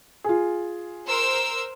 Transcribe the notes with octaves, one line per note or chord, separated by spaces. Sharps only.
F4 G#4
A#4 C5 E6